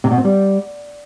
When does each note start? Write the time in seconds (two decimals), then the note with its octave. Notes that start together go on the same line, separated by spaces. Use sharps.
0.04 C3
0.11 B2
0.18 C4
0.24 G3